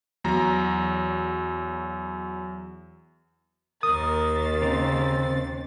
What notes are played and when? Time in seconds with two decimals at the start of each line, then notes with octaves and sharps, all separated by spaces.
0.24 E2 F#3 A#5
3.83 D#2 A#4 D#6 A6
4.62 C#3 C4 A#4